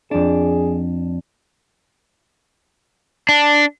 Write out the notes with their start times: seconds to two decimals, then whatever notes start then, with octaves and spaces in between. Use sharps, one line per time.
0.11 F2 D4 G#4
3.29 D4